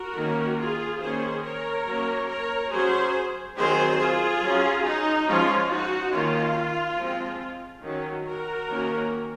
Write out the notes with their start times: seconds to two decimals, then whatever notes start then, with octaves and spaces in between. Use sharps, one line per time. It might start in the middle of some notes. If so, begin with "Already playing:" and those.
Already playing: F#4 A#4
0.16 D#3 A#3 C#4
0.59 F4 G#4
1.01 D#3 A#3 C#4 G#4 C5
1.43 A#4 C#5
1.86 F#3 A#3 C#4
2.29 A#4 C#5
2.71 F#3 C#4 G#4 C5
3.57 D#3 F#3 C4 G#4 C5
3.99 F4 G#4
4.41 F#3 C#4
4.84 D#4
5.27 F3 G#3 C#4 F4
5.69 D#4 F#4
6.12 D#3 A#3 C#4 F4
6.98 F3 G#3 C4
7.83 D#3 F#3 C#4
8.25 F#4 A#4
8.69 D#3 A#3 C#4